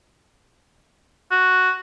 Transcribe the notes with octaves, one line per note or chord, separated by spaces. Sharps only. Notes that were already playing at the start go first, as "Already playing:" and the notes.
F#4